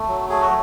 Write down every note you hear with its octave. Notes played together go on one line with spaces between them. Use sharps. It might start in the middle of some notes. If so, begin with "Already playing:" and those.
Already playing: A3
F#3
A3 G#4
F#4